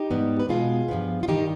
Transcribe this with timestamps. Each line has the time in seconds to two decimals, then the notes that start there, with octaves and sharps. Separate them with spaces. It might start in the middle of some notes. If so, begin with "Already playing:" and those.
Already playing: D#4 G4
0.11 G#2 G3 B3
0.40 B4
0.49 B2 G#3 B3 F4 G#4
0.88 G2 F3 B3
1.23 F4
1.28 G2 D#3 G3 D#4 G4